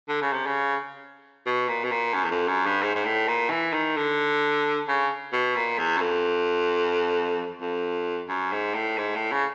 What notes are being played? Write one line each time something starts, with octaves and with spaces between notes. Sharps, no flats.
D3
C#3
C3
C#3
B2
A#2
B2
A#2
F#2
E2
F2
F#2
G2
G#2
G#2
A2
A#2
E3
D#3
D3
C#3
B2
A#2
E2
F#2
F2
F2
F#2
G#2
A2
G#2
A2
C#3